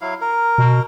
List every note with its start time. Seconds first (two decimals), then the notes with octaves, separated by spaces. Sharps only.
0.01 F#3 E4 F5
0.21 A#4
0.58 B2